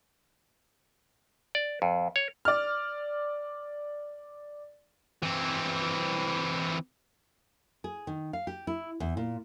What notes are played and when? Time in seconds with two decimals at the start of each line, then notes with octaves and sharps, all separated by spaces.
1.55 D5
1.82 F2
2.16 C#5
2.45 D5 F6
5.23 E3 C4
7.84 G#4
8.07 D#3
8.33 F5
8.47 G4
8.67 E4
9.00 E2
9.17 A#2